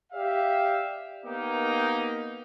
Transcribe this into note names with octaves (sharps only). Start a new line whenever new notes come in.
G4 D5 E5 F5
A#3 B3 D#4 G4 A#4